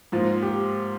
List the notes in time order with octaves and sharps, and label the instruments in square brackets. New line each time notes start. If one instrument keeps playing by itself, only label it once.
[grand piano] G#2 F3 A#3 [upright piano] F4
[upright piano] G4